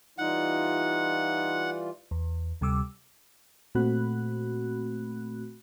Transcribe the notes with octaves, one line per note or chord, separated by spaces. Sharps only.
E3 G3 D#4 F4 F#5
E2
D2 C3 G3 D6 E6
A#2 A3 C4 F#4 B5 F#6